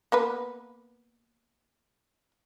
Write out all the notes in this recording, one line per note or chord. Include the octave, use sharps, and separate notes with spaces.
A#3 B3 B4